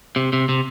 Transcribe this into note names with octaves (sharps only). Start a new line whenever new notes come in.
C3
C3
C3